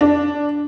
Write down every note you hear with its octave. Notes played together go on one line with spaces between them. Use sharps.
D4